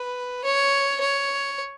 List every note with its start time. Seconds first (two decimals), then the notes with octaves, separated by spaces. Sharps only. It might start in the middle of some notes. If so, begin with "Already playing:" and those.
Already playing: B4
0.44 C#5
1.01 C#5